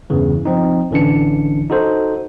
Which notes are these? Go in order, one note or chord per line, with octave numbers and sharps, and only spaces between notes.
E2 G2 C#3 E3
F3 C4 D#4
A1 D3 E3 C#4 D4 C#7
D#4 F#4 A4 C5